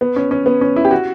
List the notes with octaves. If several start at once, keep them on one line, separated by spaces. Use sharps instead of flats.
B3
C#4
C#4
B3
C#4
E4
G4
F#4